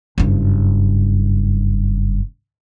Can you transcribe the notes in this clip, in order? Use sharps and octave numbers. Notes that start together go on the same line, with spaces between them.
F#1 G2